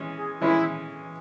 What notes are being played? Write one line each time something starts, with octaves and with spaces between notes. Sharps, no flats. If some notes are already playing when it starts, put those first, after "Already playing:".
Already playing: E3 G#3 C#4
G#4
E3 G#3 C#4 E4